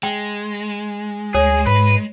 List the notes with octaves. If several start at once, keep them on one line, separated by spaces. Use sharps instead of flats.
G#3 G5
D2 G#4 C#5
G#2 B4